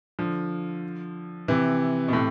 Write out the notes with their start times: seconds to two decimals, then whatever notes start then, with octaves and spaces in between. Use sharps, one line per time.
0.19 D3 F3
1.48 C3 E3
2.08 B2
2.13 A2 C3